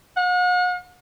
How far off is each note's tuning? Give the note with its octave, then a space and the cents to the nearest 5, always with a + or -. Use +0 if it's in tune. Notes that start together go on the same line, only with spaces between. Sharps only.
F#5 -45